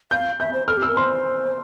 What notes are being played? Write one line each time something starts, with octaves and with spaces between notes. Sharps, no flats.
F5 G6
E5 G6
C5
A4 F6
G4
E6
A#4
C5 C6